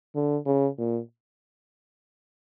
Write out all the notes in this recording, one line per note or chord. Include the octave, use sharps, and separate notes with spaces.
D3
C#3
A#2